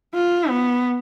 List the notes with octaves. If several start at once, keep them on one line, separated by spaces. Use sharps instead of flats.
F4
B3